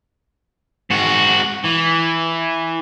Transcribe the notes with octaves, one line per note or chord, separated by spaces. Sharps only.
G#2 F#4
E3